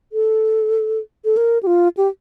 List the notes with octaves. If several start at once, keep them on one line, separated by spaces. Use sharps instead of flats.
A4
A4
A#4
G4
F4
G4